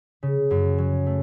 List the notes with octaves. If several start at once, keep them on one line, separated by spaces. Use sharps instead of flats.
C#3
F#2
F#3
A3